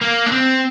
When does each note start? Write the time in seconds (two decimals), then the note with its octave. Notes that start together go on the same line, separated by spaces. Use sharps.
0.01 A#3
0.26 D4
0.32 C4